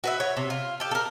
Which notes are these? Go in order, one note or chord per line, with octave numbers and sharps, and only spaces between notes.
F#4 B4 E5
C#5
C3
F4
G4 A4
A4 A#4